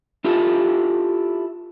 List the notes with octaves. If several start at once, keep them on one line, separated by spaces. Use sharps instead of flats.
E4 F4 G4 A4